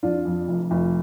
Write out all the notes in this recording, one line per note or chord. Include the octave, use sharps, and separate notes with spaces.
F2 D4 F4
F2
F1
F1